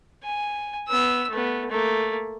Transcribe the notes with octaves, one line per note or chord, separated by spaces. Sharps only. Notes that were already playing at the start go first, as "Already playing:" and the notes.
G#5
B3 E6
A3 B3
A3 A#3